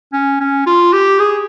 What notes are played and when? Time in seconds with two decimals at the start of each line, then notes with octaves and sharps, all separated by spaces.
0.13 C#4
0.40 C#4
0.66 F4
0.93 G4
1.19 G#4